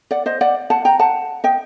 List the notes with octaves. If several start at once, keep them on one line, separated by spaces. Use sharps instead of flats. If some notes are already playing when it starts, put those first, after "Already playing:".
D5 F#5
C5 D#5
D5 F#5
F#5 A5
G5 A#5
F#5 A5
D#5 G5